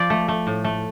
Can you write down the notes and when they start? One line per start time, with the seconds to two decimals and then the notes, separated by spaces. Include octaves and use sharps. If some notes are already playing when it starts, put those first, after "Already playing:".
Already playing: F3 D5
0.10 A3
0.28 A3
0.47 A2
0.64 A3